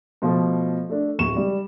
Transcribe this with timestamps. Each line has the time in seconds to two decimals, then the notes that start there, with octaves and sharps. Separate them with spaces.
0.22 B2 F3 A3
0.89 A3 D4
1.19 D1 C#6 E7
1.36 G3